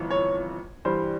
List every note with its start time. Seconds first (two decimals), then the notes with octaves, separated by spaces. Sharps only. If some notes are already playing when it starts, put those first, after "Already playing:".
Already playing: G1 F2 E3
0.10 C#5
0.85 G2 E3 G3 C5